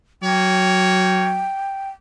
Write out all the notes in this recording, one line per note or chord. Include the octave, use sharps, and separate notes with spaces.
F#3 A#3 C#5 G5